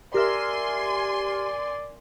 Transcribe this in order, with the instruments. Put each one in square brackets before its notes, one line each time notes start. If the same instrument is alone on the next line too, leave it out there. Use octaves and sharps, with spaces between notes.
[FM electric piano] G4 F6 [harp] A#4 E5 [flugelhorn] D5 [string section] G#5 C6